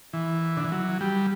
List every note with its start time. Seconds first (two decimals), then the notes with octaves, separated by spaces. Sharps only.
0.13 E3
0.57 D3
0.64 E3
0.72 F#3
1.01 G3